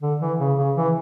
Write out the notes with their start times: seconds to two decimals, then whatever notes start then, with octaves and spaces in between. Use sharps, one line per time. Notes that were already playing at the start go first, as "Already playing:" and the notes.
0.01 D3
0.20 E3
0.39 C#3
0.58 C#3
0.76 E3